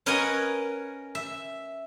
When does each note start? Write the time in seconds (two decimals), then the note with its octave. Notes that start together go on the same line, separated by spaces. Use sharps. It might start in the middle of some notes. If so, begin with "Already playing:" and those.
0.06 C#4 A#4 B4 D#5 F#5 G#5
1.15 E5